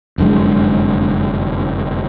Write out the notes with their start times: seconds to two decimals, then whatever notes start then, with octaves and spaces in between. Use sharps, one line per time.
0.18 F1 F#2 D3 G#3